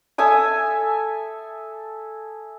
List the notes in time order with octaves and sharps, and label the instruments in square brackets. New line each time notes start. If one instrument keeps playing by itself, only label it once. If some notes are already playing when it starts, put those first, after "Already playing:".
[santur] A4 E5 G#5 D#6